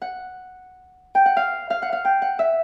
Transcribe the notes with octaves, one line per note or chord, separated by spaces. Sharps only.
F#5
G5
F#5
F5
F5
F#5
F5
G5
F#5
E5